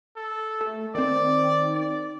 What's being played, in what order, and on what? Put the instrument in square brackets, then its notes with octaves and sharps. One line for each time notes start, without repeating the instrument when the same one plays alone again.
[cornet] A4
[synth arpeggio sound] A3
[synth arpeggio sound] D#3 C4 [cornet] D5
[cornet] D5